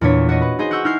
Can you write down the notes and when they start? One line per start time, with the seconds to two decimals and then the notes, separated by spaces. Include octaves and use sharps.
0.01 E2 A#2 D4 C#5 B6
0.29 F#4 C#5 D#5
0.42 B4
0.59 D#4 G#4 C5 D#5
0.71 F#5 G#5 C#6 E6 G6
0.84 D#4 E4 F6 G6 G#6 C7